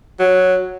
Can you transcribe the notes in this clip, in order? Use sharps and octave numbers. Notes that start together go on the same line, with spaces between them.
F#3